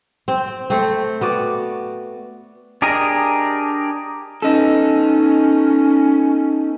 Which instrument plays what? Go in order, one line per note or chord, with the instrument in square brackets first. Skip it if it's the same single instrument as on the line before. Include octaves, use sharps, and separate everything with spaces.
[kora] C4
A3 C4
B3 F#4 D5
[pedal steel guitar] D4 G4 G#4 A#4 D#5
[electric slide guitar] B3 D#4 A4 [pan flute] C#4